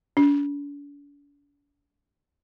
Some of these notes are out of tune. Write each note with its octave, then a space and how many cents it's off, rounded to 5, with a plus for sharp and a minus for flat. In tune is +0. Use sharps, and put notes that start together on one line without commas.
D4 -45